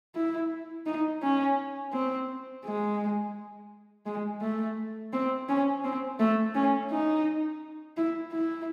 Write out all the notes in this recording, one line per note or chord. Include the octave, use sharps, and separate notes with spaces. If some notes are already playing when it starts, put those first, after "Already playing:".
E4
D#4
C#4
C4
G#3
G#3
A3
C4
C#4
C4
A3
C#4
D#4
E4
E4